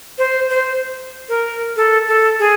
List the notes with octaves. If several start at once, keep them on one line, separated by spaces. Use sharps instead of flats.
C5
C5
A#4
A4
A4
G#4